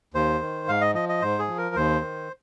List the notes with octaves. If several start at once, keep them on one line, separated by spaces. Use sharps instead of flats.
D#2 C5
D#3
G#2 F5
D#5
F3 D#5
D#5
G#2 C5
G#4
F3
A#4
D#2 C5
D#3